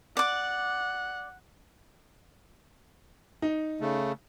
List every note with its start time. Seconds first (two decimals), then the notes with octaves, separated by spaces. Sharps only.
0.17 D5 F#5 D6
3.42 D#4
3.81 C#3 A3